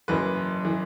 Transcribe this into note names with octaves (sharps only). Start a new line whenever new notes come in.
F#1 F#2 E3 B4
E3